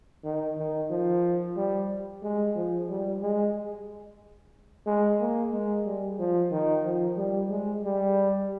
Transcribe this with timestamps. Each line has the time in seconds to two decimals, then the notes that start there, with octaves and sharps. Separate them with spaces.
0.24 D#3
0.58 D#3
0.90 F3
1.56 G3
2.23 G#3
2.56 F3
2.89 G3
3.22 G#3
4.86 G#3
5.20 A#3
5.52 G#3
5.85 G3
6.19 F3
6.51 D#3
6.85 F3
7.17 G3
7.50 G#3
7.83 G3